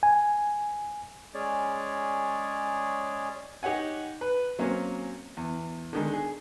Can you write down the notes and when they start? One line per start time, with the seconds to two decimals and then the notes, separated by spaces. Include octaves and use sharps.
0.03 G#5
1.34 G#3 C#4 G#4 C#5 D5
3.63 D#4 G4 C#5 F#5 G#5
4.21 B4
4.59 F#3 A#3 C4 C#4
5.37 E2
5.93 D3 D#3 G#3
6.13 G#4